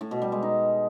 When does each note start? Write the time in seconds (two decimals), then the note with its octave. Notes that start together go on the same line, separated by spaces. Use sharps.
0.01 A2
0.11 B2
0.22 G3
0.32 G#3
0.43 D#4